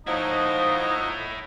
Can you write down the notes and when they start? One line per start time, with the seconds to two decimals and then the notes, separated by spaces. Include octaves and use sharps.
0.07 F3 D#4 E4 C#5 D#5 F#5